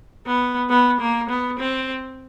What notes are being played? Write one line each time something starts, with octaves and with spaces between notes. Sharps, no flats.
B3
B3
A#3
B3
C4